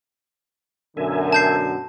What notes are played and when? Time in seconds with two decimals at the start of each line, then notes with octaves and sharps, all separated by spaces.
0.97 F#2 B2 D3 A#4 E5 G#5
1.33 A5 G6 C7